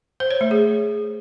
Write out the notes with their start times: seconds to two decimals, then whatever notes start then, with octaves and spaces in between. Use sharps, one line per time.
0.20 C5
0.31 C#5
0.41 A3
0.51 G#4